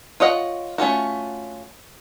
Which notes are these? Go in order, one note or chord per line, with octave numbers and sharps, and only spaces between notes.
F4 C#5 D#5 F#5
A3 C#4 F4 F#4